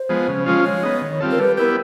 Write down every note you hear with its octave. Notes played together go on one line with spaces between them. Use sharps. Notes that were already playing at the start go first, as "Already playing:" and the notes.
Already playing: C5
F3 G#3 B3
C#3
F3 G#3 C#4 F4
G#3 C#5
B3 D#4
D#3
G3 C4 F4 A4
A#4
G3 B4
B3 E4 G4 A#4